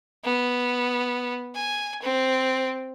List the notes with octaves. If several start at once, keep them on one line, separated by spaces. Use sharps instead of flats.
B3
G#5
C4